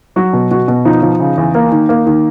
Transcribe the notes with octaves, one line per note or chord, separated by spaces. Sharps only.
F#3 F#4
B2
B2 F#4
B2
F3 D#4
F3
C#3
E2
A#3
D#3
A#3
D#3